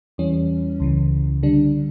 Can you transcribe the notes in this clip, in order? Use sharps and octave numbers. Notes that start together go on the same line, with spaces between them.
E2 E3 G3 C#4
C#2 C#3 E3
D3 G3 D4